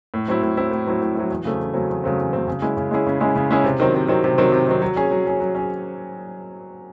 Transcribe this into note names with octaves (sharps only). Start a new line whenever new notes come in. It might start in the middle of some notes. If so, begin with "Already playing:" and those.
A2
F#3 C4 E4
A2
F#3 C4 E4
A2
F#3 C4 E4
A2
F#3 C4 E4
E2
C#3 F#3 A3 C4
E2
C#3 F#3 A3 C4
E2
C#3 F#3 A3 C4
E2
C#3 F#3 A3 C4
C#3
G#3 C#4 E4 G#4
C#3
G#3 C#4 E4 G#4
C#3
G#3 C#4 E4 G#4
C#3
G#3 C#4 E4 G#4
C3
D#3 F#3 C4
C3
D#3 F#3 C4
C3
D#3 F#3 C4
C3
D#3 F#3 C4
F#3
C#4 G#4
F#3
C#4 G#4
F#3
C#4 G#4